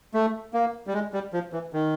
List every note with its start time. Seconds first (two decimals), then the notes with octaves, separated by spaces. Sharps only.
0.14 A3
0.54 A#3
0.87 G3
0.94 G#3
1.13 G3
1.33 F3
1.53 E3
1.73 D#3